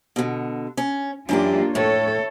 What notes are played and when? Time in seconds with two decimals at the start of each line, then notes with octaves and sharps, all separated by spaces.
0.16 B2 D3
0.77 C#4
1.29 F#2 E3 A#3 D4 F4 G4
1.75 A2 A4 C#5